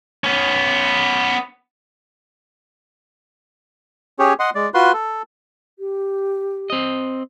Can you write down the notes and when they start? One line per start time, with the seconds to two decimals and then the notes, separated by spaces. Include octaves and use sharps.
0.24 B3 C#4
4.19 C#4 G4 G#4 C#5
4.39 D#5 F#5 C6
4.55 G#3 D5
4.74 F4 F#4 B4 C6
4.93 A4
5.79 G4
6.70 C4 D#5